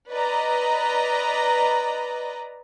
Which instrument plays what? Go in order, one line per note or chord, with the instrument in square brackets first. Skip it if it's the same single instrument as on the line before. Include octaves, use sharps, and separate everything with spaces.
[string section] B4 D5 D#5 A#5